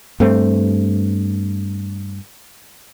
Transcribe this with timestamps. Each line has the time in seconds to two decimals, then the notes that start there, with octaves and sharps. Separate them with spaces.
0.20 G2 A3 C4